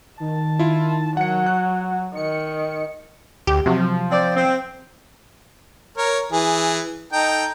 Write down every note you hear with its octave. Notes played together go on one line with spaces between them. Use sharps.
D#3 A5
E4 F4
F#3 F#5 C#7
F#5 F#6
D#3 C#7
D2 G4
C3 F3 F#3
C4 C5 D5
C4
A#4 C#5
E3 G#4
D#4 A4 G5